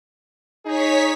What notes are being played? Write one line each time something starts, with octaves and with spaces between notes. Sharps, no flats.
D#4 G#4 C#5 B6